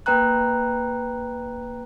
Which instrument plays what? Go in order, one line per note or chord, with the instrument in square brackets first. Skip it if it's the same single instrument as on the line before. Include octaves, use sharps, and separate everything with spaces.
[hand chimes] A#3 B4 G5 A#5 F#6